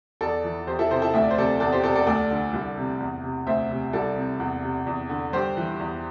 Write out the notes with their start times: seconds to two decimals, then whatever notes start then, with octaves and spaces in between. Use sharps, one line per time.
0.21 E2 A4 D5
0.44 E3
0.67 E2 G4 C5
0.79 E4 A4
0.90 C3 G4 C5
1.02 E4 A4
1.14 D2 E5
1.22 D5
1.30 C5
1.37 C3 A4 D5
1.60 E2 A4 D5
1.72 G4 C5
1.83 C3 A4 D5
1.95 A4 D5
2.07 D2 A4 D5
2.30 D3
2.53 C2
2.77 C3
3.00 E2
3.24 C3
3.47 D2 C5 E5
3.70 C3
3.93 C2 A4 D5
4.16 C3
4.40 E2
4.63 C3
4.87 E2
5.09 D3
5.33 G2 G4 C5
5.57 E3
5.80 E2